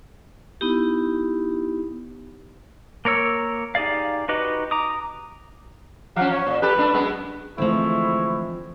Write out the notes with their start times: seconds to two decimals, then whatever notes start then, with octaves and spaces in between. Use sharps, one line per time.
0.61 B3 D#4 E4 G4
3.05 A#3 A#4 C#5 E6
3.75 D#4 G4 G#4 D5 F5
4.29 D#4 F#4 G4 B4 D#5
4.71 A#5 D6 D#6
6.16 F3 C#4 F5 F#5
6.32 C#5
6.47 A#2
6.62 G4 A4 B4 F#6
6.77 A3 D4
6.94 F#2 G#3 B3
7.58 D3 E3 F3 G#3 A3 C4 E4 C#6